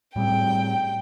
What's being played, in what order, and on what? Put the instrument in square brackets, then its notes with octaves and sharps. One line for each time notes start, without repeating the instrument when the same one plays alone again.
[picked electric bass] A2 G3 C4 [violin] G5